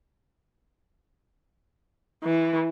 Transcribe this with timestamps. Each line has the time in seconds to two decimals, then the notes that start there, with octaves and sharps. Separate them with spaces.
2.24 E3